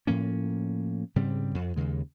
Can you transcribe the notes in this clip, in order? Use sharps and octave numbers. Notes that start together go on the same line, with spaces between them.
A2 F3 A#3 C#4
G#2 C#3 G3 C4
F2
D#2 C#3 G#3